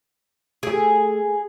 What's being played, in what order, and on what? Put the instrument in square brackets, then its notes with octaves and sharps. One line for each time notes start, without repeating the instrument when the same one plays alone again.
[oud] A3 G4 [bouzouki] G#4